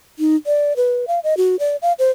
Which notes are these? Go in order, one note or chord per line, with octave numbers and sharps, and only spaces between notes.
D#4
D5
B4
F5
D#5
F#4
D5
F5
C5